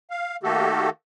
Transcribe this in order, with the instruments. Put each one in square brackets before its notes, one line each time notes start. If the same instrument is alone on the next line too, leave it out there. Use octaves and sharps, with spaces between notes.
[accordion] F5
D#3 A3 A#3 F#4 G4 A4